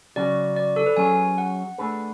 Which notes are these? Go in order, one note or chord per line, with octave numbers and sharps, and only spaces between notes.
C#3 F#3 C#4 F#4 D5
D5
A4
B4
F#3 C#4 G#4 C#5 G#5
F#5
A3 D4 G#4 B4